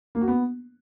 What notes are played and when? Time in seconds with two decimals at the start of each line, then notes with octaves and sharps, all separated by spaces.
0.15 A#3
0.21 F#4
0.28 B3